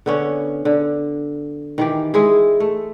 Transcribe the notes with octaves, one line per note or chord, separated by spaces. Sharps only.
D3 B3 C#4
D3
D#3 E3 G4
G#3 E4 G#4
A3